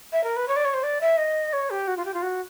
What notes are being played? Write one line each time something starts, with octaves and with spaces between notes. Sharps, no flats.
E5
A#4
B4
C#5
D5
C#5
C5
D5
E5
D#5
C#5
G4
F#4
F4
G4
F4
F#4